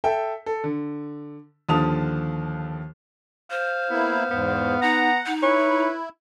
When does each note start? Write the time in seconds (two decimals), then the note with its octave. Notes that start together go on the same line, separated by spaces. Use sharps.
0.04 A4 E5 G5
0.46 A4
0.64 D3
1.69 D#2 D3 F3 A5 D#6 F7
3.50 C5 F5
3.90 A#3 B3 E4
4.31 E2 G#2 B3
4.82 D#4 F#5 A#5
5.26 D#4
5.43 E4 B4 C#5